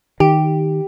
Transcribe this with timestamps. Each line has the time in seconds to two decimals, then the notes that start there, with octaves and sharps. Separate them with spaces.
0.20 D#3 G4